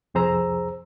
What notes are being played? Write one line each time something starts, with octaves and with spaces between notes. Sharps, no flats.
C2 F2 G#4 C5 A#5 E6